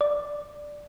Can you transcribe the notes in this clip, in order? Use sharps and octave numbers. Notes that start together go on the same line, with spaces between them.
D5